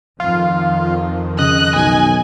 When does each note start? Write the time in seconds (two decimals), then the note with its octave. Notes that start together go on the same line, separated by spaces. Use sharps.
0.20 F2 D#3 F3 F4
1.39 C#3 D#5 F#6
1.75 B1 G#5